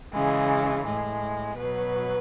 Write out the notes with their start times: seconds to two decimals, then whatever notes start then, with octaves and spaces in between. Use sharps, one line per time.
0.12 C#3 E3 G#3
0.85 A2 G#3
1.57 B2 F#3 B4